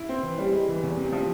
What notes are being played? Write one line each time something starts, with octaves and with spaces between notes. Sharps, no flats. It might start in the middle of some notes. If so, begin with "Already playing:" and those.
Already playing: E4
C4
E3
G3
G#3
E3
E2
C3
F3